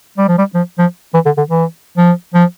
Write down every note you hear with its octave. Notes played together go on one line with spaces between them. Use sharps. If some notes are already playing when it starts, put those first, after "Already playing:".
G3
F3
G3
F3
F3
E3
D3
D3
E3
F3
F3